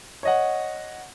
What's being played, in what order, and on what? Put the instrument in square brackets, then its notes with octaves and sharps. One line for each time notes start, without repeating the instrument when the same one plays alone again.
[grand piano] C#5 D#5 F#5